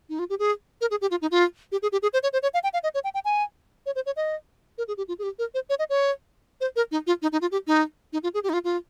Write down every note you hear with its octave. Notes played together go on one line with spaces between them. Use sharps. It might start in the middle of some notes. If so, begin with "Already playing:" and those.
D#4
F4
G4
G#4
A#4
G#4
G4
F4
D#4
F4
G4
G#4
G4
G#4
C5
C#5
C5
C#5
F5
G5
F5
D#5
C#5
G5
G5
G#5
C#5
C5
C#5
D#5
A#4
G#4
G4
F4
G#4
G4
A#4
C5
C#5
D#5
C#5
C5
A#4
D#4
F4
D#4
D#4
F4
G4
D#4
D#4
F4
G#4
G4
D#4
F4
F4